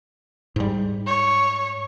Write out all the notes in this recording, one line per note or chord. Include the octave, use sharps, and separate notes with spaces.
G#2 G3
C#5